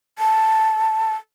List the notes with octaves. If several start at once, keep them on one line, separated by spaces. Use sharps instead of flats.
A5